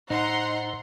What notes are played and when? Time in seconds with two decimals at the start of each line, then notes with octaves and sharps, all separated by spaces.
0.10 A2 D#4 C5 F#5 A#5 C6